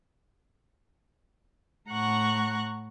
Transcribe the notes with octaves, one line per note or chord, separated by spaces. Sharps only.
A2 F#5 A#5 C#6 F#6